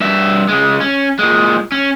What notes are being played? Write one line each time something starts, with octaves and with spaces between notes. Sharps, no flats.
G2 E5
C#3 G#3
C#4
A#2 G#3
C#4